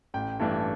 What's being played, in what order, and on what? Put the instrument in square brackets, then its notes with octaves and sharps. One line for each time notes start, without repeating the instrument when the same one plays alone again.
[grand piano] A1 G5
G2 E3 A3 D4